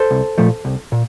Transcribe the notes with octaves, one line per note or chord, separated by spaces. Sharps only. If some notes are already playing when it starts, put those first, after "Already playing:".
Already playing: A4 C5
C2
A#2 F3 A3
C2
A#2